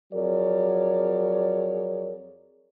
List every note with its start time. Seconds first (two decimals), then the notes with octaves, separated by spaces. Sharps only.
0.13 F2 F#3 G#4 A#4 C#5 D5